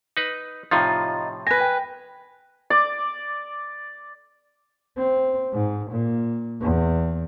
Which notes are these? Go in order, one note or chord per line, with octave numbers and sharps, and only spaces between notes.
D#4 B4
A2 C3 F3 D#4 F4 A6
B4 G#5 A#6
G5
D5 D6
C4
G#2
A#2
E2